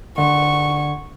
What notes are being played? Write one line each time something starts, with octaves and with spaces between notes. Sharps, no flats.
D3 C#6